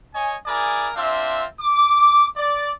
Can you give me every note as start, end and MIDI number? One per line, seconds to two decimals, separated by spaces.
0.14 0.36 73
0.14 0.36 75
0.14 0.36 80
0.46 0.90 64
0.46 0.90 68
0.46 0.90 70
0.46 0.90 74
0.46 0.90 80
0.96 1.45 60
0.96 1.45 62
0.96 1.45 65
0.96 1.45 76
1.60 2.26 86
2.37 2.72 74